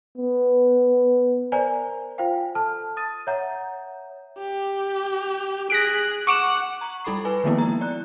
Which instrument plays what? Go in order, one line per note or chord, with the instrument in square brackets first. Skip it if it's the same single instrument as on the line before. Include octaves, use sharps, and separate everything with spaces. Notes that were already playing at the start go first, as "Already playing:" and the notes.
[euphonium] B3
[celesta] A#4 C5 D5 G#5 A#5
F4 C5 F5 G5
A4 A5 F6
D#6 A6 D#7
C#5 E5 F#5 A#5 G6
[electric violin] G4
[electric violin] G#4 F#6 [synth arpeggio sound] A#6 B6 D7
[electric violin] F#5 [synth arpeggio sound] C#6 D6 E7
[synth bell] A#5 C#6 F#7
G3 E4 A4 B5 D6 C7
B4 G#5
D#3 F3 G#3 A#3 B3 E4
A#5
D5 F#6